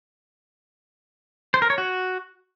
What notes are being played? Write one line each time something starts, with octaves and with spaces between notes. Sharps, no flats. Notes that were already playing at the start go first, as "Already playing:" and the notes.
C5
A#4
C#5
F#4